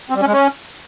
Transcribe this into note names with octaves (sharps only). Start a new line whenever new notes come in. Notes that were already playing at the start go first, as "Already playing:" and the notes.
C4
G3
C#4
G#3
C#4